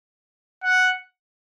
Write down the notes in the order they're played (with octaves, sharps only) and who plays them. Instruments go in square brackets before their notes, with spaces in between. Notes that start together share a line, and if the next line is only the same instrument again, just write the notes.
[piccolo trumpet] F#5